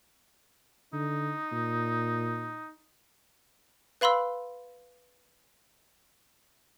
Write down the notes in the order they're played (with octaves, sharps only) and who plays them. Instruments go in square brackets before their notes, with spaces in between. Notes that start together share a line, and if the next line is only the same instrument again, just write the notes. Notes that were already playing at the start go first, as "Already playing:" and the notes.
[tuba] D3 [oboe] D#4
[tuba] A#2
[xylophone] B4 F5 B5 C6 E6